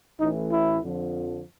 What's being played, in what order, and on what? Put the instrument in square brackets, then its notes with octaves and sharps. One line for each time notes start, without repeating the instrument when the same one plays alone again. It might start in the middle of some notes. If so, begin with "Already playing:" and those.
[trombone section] A1 A2 E3 D#4
E4
F2 D3 F3